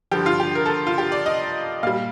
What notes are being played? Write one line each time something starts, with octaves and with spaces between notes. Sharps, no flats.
G2 D3 F3 G4
F4
G4
A#4
A4
F4
G4
D5
D#5
A#2 G3 F5